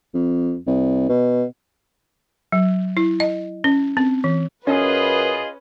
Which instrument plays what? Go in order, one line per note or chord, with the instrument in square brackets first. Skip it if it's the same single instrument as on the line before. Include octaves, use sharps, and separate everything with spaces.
[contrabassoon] F2
C2
B2
[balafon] F#3
E4
D#5
C#4
C4
E3
[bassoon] F#2 [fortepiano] C#4 [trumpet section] F4 G#4 D#5 [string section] B4